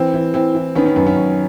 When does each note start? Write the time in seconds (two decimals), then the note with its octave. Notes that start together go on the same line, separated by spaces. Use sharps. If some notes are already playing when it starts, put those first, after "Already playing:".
Already playing: E3 C4
0.14 E3
0.34 E3 C4
0.55 E3
0.75 D#3 B3 C#4
0.86 B3 C#4
0.96 F#2 B3 C#4
1.06 B3 C#4
1.16 F#2